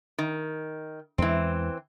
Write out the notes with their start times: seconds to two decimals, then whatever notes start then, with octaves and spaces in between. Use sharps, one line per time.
0.18 D#3
1.18 E2 E3 G#3 C4